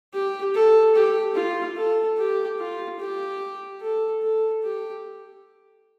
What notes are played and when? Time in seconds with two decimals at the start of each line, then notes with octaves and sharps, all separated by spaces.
0.13 G4
0.55 A4
0.95 G4
1.36 F4
1.77 A4
2.18 G4
2.59 F4
3.00 G4
3.82 A4
4.23 A4
4.63 G4